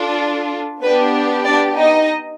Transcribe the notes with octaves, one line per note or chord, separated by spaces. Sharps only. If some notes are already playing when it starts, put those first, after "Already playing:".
Already playing: D4 F4 A4
B3 D4 G4 B4
D4 D5
D#4 D#5